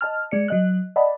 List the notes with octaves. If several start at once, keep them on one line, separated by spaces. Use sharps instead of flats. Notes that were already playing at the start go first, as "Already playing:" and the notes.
D#5 A5 F6
G#3 D5 C#7
F#3 D#5 F#6
D5 D#5 F#5 A5 B5